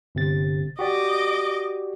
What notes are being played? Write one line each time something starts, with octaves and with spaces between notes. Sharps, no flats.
G1 C3 A6
F#4 G4 D5 D#5 D6